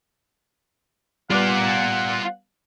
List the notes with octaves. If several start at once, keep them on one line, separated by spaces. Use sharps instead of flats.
G3 B3 F4 D5 F#5